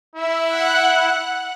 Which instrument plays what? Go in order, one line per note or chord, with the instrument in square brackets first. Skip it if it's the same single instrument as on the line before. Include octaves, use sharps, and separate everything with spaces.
[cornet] E4 [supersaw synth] E5 E6
[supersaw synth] F#5 F#6